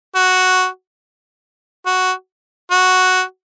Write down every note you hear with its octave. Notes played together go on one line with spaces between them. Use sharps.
F#4
F#4
F#4